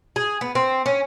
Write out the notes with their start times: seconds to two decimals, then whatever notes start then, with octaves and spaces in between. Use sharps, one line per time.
0.16 G#4
0.41 B3
0.55 C4
0.86 C#4